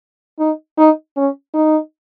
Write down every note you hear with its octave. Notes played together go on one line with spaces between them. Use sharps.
D#4
D#4
C#4
D#4